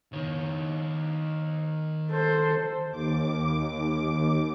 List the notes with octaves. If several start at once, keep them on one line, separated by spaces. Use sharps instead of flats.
D#3 C#5
A4 C5
D#2 D6